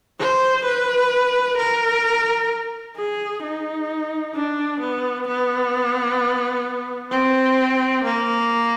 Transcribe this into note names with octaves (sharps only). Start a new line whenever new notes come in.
C5
B4
A#4
G#4
D#4
D4
B3
B3
C4
A#3